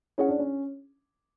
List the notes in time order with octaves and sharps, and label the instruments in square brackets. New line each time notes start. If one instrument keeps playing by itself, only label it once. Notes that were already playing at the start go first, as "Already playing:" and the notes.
[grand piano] C#4 [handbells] E4 G#4 C#5 F#5
[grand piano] D4
C#4